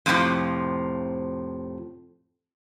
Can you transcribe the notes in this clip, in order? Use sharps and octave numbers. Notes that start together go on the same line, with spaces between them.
F2 A2 C3 E3 F3